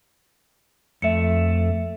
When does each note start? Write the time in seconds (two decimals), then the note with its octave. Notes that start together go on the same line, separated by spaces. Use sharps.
1.02 F2 A3 E5 C#7